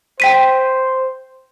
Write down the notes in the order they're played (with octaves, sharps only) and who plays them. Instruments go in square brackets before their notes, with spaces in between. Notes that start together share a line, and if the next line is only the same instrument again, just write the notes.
[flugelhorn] C5 [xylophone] G5 B6 D#7